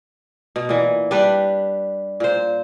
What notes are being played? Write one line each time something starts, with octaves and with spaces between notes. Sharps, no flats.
B2
A#2 E3
G3 D4 B4
A#2 C5